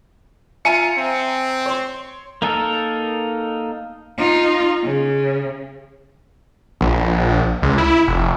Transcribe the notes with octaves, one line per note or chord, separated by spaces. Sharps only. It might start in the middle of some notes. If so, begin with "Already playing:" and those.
F4 E5 G#5 A#5 C#7 D#7
C4
C#5 C6
A#3 D#4 A4 A#4
D#4 F4
C#3
A#1
C#2
E4
F1